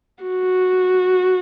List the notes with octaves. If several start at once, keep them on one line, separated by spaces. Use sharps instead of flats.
F#4